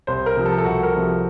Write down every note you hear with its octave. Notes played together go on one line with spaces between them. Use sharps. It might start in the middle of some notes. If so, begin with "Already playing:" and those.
C2 C5
A#4
C3 F3
A4
A4
C2 F#4
A#4
C3 F3